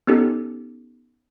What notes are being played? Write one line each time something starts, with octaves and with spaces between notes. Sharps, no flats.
B3 C#4 D#4 G4 A4